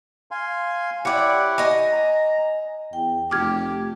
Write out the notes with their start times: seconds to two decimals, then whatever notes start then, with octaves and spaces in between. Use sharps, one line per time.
0.31 F5 G#5 C6
1.05 E4 G4 C#5 D5 F#5
1.58 D#5 G#5
1.92 A#5
2.93 E2 G5
3.31 F1 A3 G4 D6 F6 G#6